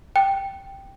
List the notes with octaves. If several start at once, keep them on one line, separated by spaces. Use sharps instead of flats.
G5